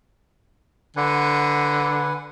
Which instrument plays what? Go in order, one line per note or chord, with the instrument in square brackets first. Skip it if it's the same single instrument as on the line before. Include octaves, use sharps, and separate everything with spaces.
[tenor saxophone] D3 [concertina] B4 F#5 G#5